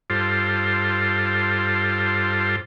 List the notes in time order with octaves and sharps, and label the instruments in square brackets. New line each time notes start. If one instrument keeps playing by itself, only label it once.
[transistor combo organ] G2 F4 A4 C5